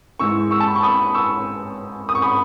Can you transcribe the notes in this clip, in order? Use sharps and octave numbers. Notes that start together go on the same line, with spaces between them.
G#2 E3 G#3 C#6 E6
C#6 E6
A5
B5
C#6
B5 D#6
C#6 E6
D#6
C#6
B5 D#6